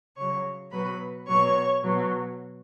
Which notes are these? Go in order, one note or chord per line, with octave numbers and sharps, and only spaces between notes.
C#3 F#3 C#5 C#6
B2 F#3 B4 B5
B2 F#3 C#5 C#6
B2 F#3